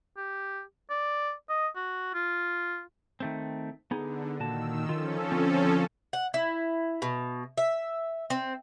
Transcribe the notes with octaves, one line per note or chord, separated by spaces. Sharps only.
G4
D5
D#5
F#4
F4
D#3 A3 C4
D3 B3 D#4 G#4
A#2 D#3 F#4 A5 E6
D#3 F3 C#4 F4 A4
D3 C4
F#5
E4
B2
E5
C4